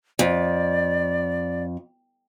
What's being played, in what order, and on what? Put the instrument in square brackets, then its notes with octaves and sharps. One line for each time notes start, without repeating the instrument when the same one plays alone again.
[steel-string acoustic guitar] F2 [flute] D5